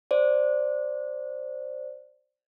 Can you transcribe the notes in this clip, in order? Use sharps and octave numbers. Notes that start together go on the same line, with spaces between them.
C5 D5